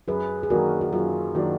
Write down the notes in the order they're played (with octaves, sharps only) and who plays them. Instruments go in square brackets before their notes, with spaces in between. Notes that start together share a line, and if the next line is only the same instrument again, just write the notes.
[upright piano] F#2 [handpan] G#4 B4
[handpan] G#4
[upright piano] D#3 F#3 A#3 D4 [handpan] F#4 A#4
[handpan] F#4
[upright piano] F#2 [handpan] F4 G#4
[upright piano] D#3 F#3 A#3 D4 [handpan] D#4 F#4